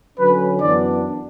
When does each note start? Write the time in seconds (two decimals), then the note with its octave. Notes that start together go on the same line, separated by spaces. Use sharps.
0.18 D3 F#3 C#4 B4
0.61 F#2 E3 B3 D4 D5